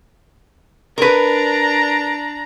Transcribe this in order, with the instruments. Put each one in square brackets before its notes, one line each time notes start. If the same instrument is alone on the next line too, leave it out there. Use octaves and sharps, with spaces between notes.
[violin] D4 A#5 [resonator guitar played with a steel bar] A#4 B4